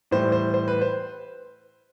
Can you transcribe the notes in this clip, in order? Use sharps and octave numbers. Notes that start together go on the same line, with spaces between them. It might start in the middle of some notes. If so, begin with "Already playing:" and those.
A2 E3 G3 C5
C5
C5
B4
C5